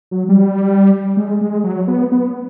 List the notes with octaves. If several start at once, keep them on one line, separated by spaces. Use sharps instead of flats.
F#3
G3
G#3
G#3
F#3
B3
B3